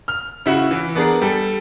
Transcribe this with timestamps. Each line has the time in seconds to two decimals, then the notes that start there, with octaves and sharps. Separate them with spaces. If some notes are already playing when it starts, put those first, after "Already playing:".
0.08 F6
0.46 C#3 E4 F#4
0.71 E3
0.95 B3 D4 G#4 A#4
1.22 G3 A4